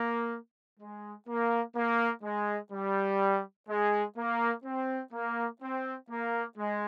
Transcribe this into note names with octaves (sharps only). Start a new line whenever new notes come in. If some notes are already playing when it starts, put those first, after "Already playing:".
Already playing: A#3
G#3
A#3
A#3
G#3
G3
G#3
A#3
C4
A#3
C4
A#3
G#3